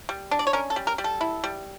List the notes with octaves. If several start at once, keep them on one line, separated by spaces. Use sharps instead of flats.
G3
D4
D5
C#5
C#4 A#4
A4
G3
A#4
G3
A4
E4
G3